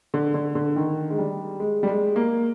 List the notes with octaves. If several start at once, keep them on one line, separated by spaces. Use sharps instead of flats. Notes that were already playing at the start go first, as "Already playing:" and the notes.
D3
D3
D3
D#3
G#3
G3
G#3
G3
G#3
A#3